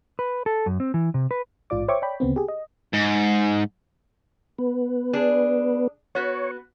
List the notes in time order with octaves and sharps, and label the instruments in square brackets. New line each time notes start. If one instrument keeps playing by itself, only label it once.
[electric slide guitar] B4
A4
F#2
C4
E3
C3
B4
[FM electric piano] A1 G#2 F4 D5 D6
C5 C#5 E5 G5 C#6 D6
C#5 D5 G5 B5
D2 C#3 B3 C4
G4 G#4
D#5
[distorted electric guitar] G#2
[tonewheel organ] B3
[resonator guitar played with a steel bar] D4 G#4
[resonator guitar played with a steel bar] B3 F#4 [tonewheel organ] C#5